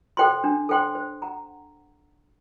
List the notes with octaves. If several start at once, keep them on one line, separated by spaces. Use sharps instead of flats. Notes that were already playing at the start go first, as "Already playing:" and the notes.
A4 C5 G5 C6
D4
A4 C5 G5 C6
C5
F#5 A#5